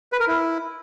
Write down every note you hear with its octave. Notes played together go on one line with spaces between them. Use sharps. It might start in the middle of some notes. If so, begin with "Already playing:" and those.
B4
A#4
E4